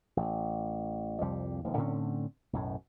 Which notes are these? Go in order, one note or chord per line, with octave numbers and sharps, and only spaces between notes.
A1
C2 F2 G3
E1 D#2 F3
A2 D3 C4 C#4
B1 F#2 A2